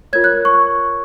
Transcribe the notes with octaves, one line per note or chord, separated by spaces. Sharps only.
F4 A#4 C#5 G#6
F#6
C#6